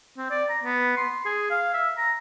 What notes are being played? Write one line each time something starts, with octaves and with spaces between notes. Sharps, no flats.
C4
D5
A#5
B3
C6
G#4
F5
E5
A#5